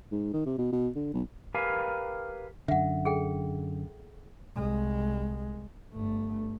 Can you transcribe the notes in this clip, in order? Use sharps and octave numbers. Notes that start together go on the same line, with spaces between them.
G#2
D#3
C3
B2
B2
D3
B1
G4 A#4 B4 F5 G#5
F#2 D3 E5 F#5
G#4 A4 G5
C2 G#3
G1 A3